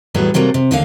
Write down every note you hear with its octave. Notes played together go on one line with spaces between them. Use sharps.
E2 A2 F#3 G3 A3 B3
C3 F#3 G3 A3 A#3
C3
D#2 D3 A3 A#3 F5